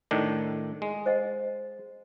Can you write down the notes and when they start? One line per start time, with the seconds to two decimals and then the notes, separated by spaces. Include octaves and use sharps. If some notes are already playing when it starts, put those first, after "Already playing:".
0.11 A2 D#3 D4
0.82 G#3
1.06 C5 D#5 F#5